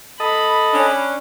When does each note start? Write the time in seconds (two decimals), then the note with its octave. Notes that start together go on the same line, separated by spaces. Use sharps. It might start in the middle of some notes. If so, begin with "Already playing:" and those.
0.20 A4 D#5 B5
0.73 C#4 D4